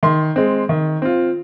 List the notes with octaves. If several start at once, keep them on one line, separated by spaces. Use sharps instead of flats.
D#3 C6
G#3 C4
D#3
C4 F4